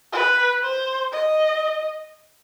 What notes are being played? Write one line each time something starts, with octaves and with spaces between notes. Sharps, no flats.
B4
C5
D#5